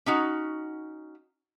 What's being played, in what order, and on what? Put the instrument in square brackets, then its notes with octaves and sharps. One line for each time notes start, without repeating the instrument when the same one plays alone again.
[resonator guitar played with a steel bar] C#4 D#4 F#4